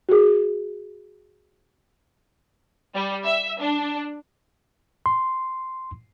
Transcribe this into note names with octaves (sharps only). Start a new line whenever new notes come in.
F#4 G#4
G3
E5
D4
C6